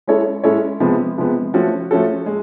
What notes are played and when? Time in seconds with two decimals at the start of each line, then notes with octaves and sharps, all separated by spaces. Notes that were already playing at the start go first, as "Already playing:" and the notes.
0.07 G#3 C#4 E4 A4 C#5
0.44 G#3 C#4 E4 A4 C#5
0.80 C3 F3 G#3 B3
1.18 C3 F3 G#3 B3
1.54 F3 A3 C#4 F#4 A4
1.91 F3 A3 C#4 F#4 A4
2.26 G#3